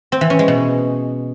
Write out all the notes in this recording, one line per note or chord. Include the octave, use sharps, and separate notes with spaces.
C4
E3
C#4
G#3
B2